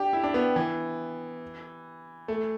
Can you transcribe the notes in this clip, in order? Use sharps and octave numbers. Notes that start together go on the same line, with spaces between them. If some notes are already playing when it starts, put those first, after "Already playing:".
Already playing: D4 G4
E4
D4
B3
E3
A3